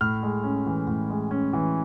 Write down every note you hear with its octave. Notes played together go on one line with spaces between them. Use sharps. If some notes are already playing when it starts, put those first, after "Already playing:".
A2 F6
G#3
C#4
E3
A2
G#3
C#4
E3